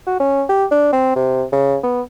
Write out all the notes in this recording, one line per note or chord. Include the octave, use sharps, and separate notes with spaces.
F#4
C#4
G4
D4
C4
C3
C#3
B3